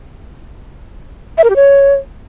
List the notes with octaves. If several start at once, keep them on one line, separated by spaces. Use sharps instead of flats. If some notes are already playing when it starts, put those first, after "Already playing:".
E5
A#4
G4
C#5